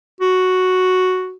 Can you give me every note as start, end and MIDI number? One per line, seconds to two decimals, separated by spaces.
0.21 1.35 66